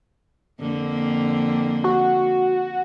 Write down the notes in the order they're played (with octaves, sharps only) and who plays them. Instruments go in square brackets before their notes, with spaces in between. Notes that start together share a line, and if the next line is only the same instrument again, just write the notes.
[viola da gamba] F2 D3 A#3
[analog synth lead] F#4